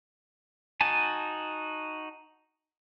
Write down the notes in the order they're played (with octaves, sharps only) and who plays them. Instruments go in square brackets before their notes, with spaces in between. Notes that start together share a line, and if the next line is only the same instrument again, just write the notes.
[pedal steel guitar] D#4 F#4 G#5 A5